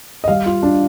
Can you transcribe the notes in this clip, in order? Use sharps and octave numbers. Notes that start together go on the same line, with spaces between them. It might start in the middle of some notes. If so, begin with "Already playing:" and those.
D#5
G3 F5
F4
D4